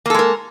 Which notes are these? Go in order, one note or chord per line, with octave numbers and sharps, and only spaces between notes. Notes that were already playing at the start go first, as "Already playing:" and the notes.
G#3 A#3 A4 A#4